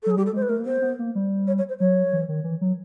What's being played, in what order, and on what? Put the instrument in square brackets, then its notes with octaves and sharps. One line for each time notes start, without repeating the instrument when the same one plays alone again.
[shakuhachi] A4
[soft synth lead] F#3 [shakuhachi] G#4
[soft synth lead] G3 [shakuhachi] G4
[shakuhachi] A4
[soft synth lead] G#3 [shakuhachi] C5
[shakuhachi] B4
[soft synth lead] A3 [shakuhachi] A#4
[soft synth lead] A#3
[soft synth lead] B3 [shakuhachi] C5
[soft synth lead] B3
A#3
G3
[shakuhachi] C#5
C#5
C5
[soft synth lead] F#3 [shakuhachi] C#5
[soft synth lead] E3
D#3
E3
F#3